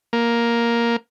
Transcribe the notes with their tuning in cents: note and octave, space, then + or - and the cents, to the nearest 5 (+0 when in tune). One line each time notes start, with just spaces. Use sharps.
A#3 +5